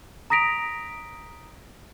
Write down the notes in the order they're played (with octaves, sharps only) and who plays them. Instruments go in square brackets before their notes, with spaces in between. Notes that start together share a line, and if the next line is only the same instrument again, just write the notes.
[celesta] A#5 D#6 A#6 B6 D7 F7